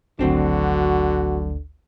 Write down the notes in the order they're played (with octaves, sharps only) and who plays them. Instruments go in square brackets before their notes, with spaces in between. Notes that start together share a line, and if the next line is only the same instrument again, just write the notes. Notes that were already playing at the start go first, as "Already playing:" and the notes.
[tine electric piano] G#1 D2 [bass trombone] D3 [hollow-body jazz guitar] F#3 C4 D4 [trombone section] F#4